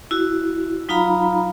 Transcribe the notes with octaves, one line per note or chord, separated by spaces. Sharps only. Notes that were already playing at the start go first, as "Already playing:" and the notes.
E4 F#4
F#3 D#4 F4 F5 A#5 B5